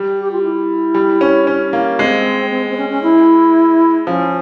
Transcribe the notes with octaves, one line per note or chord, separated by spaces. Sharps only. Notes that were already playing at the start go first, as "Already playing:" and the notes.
Already playing: G3
G4
F4
E4
G3
C#4
C#4
A#3
G#3 C4
C4
C4
C#4
C#4
E4
F3 C#4